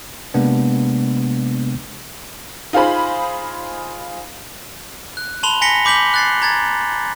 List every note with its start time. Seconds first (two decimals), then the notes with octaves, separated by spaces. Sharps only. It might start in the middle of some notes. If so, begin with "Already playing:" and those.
0.34 C3 G#3 A#3 B3 D4
2.73 D#4 F4 G#4 C5 B5
5.17 F#6
5.43 A5 B5 C6 F7 G7
5.61 G#5 B5 A#6 B6 C#7 G7
5.85 B5 D6 G6 B6 F#7
6.14 F#6 A6 C7
6.42 A#5 G#6 A6